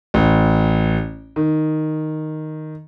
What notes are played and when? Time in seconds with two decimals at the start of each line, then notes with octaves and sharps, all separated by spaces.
0.14 A1
1.36 D#3